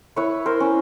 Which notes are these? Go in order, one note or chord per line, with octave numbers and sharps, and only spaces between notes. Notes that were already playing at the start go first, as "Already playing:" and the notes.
E4 B4 C#5
A#4 C5
C#4